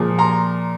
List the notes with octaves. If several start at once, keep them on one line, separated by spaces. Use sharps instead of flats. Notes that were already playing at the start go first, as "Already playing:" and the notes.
Already playing: A#2 F3 G#3
A#5 C6